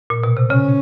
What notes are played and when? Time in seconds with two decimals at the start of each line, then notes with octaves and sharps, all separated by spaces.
0.10 A#2
0.24 B2
0.37 C3
0.50 C#3 C#4